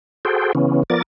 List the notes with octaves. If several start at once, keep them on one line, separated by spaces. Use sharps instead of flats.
F#4 G#4 A4 C5 G5
C#3 E3 B3 C#4
F3 B3 A#4 D5 A6